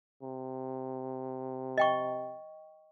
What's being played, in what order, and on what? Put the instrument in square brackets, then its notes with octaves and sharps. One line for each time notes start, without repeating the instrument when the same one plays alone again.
[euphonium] C3
[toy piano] D#5 G5 C#6